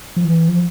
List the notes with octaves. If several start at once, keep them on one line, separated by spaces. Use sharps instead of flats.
F3
E3
F3